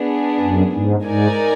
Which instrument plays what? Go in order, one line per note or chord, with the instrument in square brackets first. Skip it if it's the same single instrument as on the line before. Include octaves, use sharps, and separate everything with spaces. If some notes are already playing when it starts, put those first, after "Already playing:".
Already playing: [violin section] B3 D4 G#4
[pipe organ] F#2
G#2
[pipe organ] G#2 [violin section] D#4 A#4 D5 G#5